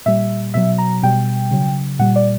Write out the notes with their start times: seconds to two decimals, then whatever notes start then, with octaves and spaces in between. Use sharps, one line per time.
0.06 A#2 G3 E5
0.54 B2 F#3 E5
0.78 A#5
1.03 B2 G3 G5
1.51 C#3 F#3
1.99 A#2 G3 F#5
2.16 D5